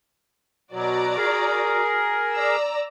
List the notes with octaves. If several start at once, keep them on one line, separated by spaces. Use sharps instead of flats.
B2 F#3 F#4 D5 A#5
G#4 A#4
D5 A#5 E6